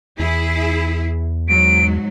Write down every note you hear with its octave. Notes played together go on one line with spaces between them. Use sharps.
E2 E4 G#4
G#2 F#3 D7